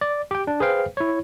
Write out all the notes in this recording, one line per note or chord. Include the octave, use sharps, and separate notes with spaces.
D5
G4 G5
D4
G#4 B4 C5 F5 G5
E4 C#5